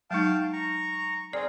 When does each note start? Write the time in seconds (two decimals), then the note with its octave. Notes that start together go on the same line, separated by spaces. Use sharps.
0.11 F#3 G#3 D#4 F5 G5 A5
0.53 A#5 C#6
1.33 C4 G#4 A#4 D5